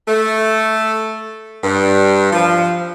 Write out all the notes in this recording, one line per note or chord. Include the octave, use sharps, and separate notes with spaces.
A3
G2
F3